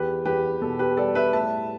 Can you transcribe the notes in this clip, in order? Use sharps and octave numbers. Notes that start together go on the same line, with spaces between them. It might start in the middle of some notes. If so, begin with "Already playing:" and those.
Already playing: E2 G4 B4
E2 G4 B4
B2 A4
G4 B4
G3 A4 D5
B4 E5
A2 E5 A5